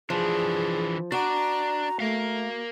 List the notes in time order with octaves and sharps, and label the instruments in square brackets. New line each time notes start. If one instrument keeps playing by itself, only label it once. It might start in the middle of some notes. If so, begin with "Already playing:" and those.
[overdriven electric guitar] E3 D4 [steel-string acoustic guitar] F3 [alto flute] G#4
[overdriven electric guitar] D4 D5 [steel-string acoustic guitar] F#4 [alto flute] A#5
[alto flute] A3 [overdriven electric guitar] A#4 F5